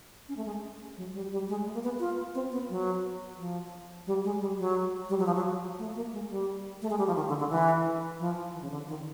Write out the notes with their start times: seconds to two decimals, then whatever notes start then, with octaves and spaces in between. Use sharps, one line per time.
0.28 C#4
0.37 A3
0.46 G#3
0.97 F#3
1.14 G3
1.31 G3
1.49 G#3
1.66 A3
1.74 A#3
1.83 B3
2.00 F4
2.35 C4
2.52 B3
2.70 F#3
3.37 F3
4.07 G3
4.24 G#3
4.40 G3
4.58 F#3
5.09 G3
5.19 F#3
5.26 F3
5.36 F#3
5.78 A3
5.95 A#3
6.13 G#3
6.30 G3
6.82 A3
6.90 G#3
6.98 G3
7.07 F3
7.16 D#3
7.28 D3
7.39 D3
7.50 E3
8.19 F3
8.54 E3
8.62 C#3
8.70 D3
8.88 D#3